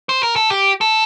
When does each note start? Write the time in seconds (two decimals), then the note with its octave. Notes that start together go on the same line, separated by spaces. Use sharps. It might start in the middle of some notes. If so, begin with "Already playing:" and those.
0.09 C5
0.23 A#4
0.36 A4
0.50 G4
0.81 A4